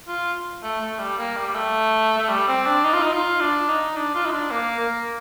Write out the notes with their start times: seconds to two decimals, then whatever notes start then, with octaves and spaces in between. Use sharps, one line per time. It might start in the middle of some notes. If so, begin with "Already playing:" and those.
0.08 F4
0.63 A3
0.81 A3
0.99 G3
1.18 A#3
1.36 G3
1.55 A3
2.18 A3
2.29 G3
2.48 C4
2.66 D4
2.84 D#4
2.93 F4
3.02 D#4
3.13 F4
3.40 D4
3.69 D#4
3.96 D4
4.15 F4
4.25 D#4
4.32 D4
4.51 A#3
4.79 A#3